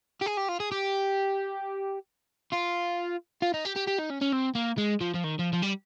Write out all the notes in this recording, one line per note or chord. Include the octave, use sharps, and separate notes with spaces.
G4
G#4
G4
F4
G#4
G4
F4
F4
D#4
G4
G4
G4
D#4
C#4
C#4
C4
A#3
G#3
F3
F3
D#3
F3
F3
G3